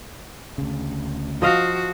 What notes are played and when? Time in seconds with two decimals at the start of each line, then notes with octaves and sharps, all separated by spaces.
0.58 D2 C#3
1.42 F3 F#4 D#5 F5